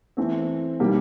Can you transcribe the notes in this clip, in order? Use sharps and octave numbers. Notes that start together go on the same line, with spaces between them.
E3 A3 C4
B2 G3 A#3 D#4 G4